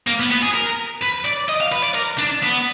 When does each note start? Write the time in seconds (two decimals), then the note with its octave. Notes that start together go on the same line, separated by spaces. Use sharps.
0.07 A#3
0.20 B3
0.31 B3
0.42 G#4
0.54 A#4
1.01 B4
1.25 D5
1.48 D#5
1.60 F5
1.72 B4
1.83 D5
1.95 A#4
2.19 D4
2.43 B3